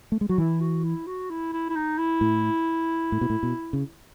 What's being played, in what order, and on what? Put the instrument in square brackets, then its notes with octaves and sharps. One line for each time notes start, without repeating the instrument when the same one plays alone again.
[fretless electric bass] A3
G#3
[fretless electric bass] F#3 [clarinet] F#4
[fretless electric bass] E3 [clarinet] E4
[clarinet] F#4
E4
F#4
E4
E4
E4
D#4
E4
[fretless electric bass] A2
A2
B2
A2
B2
C#3